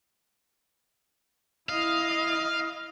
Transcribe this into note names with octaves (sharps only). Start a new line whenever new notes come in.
E4 D#5 F5